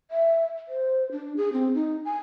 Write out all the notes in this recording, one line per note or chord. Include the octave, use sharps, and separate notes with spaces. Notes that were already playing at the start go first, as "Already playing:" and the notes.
E5
C5
D4
G#4
C4
D#4
G#5